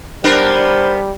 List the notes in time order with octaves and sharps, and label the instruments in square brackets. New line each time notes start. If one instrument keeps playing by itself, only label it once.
[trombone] G3 [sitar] B3 D4 A#4 [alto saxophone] C5